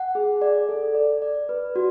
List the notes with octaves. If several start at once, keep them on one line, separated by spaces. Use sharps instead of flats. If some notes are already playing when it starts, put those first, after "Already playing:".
Already playing: F#5
G#4
D5
A4
D5
D5
B4
F#4